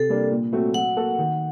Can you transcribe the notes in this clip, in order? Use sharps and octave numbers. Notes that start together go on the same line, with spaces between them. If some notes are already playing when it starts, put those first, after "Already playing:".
Already playing: C3 A4
G3 A#3 D4
A#2
F#3 A3 C4 F#4
F#3 F#5
A#3 F#4 A4
D#3